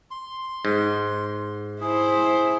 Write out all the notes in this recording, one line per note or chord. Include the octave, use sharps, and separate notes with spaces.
C6
G#2
E4 G#4 C5